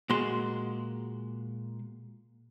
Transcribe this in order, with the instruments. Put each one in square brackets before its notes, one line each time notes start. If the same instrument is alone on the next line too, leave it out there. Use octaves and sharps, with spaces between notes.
[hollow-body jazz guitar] A#2 G#3 F#4 C6